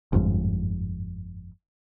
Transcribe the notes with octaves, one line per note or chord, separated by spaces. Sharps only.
G1 F2 G#2